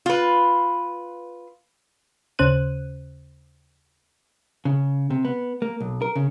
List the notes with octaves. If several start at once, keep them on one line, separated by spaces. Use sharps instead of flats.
F4 B4
D#2 C#3 C#4 C5 F#6 D#7
C#3
C3
B3
A#3
B1
A#4
C#3